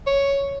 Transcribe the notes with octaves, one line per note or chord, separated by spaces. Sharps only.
C#5